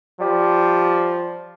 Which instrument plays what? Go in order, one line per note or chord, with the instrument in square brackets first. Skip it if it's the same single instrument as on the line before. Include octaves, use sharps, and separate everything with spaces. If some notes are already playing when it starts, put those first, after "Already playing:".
[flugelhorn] F3 [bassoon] G3